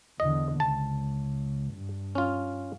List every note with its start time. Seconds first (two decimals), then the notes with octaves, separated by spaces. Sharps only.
0.20 E2 D3 D#5
0.60 C#2 A5
1.74 G2
2.15 C#4 F4